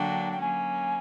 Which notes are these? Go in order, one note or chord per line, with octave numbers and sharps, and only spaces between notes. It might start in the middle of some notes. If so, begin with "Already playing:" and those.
Already playing: D3 F#3 A#3 D4 F#4 G5
G5
F#3 A#3 C#4 G#5